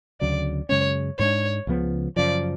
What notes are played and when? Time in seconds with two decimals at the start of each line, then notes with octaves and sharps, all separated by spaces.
0.21 D2 C#3 F#3 D5
0.69 F#2 C#3 G#3 C#4 C#5
1.18 G#2 G#3 B3 D4 C#5
1.67 C#2 C#3 F3 B3
2.16 F#2 C#3 F3 D5